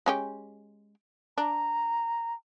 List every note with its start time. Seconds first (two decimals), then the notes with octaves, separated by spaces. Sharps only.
0.06 G#3 C#4 G4
1.38 D4 A#5